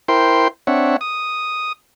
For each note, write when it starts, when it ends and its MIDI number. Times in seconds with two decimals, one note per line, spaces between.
0.08 0.48 64
0.08 0.48 70
0.08 0.48 72
0.08 0.48 79
0.08 0.48 84
0.67 0.97 60
0.67 0.97 62
0.67 0.97 73
0.67 0.97 76
0.67 0.97 78
1.01 1.72 87